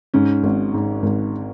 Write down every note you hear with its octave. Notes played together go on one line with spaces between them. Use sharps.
G#2 C#4
G#1
G#2
G#1